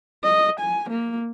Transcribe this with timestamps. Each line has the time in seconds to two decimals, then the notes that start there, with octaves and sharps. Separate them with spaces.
0.24 D#5
0.60 G#5
0.89 A#3